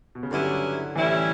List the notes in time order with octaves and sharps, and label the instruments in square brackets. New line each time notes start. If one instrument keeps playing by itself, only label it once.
[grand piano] B2
C#3
[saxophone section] G2 F#3 C#4 E4 [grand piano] D3
[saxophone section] A2 G3 C#4 E4 [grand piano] E3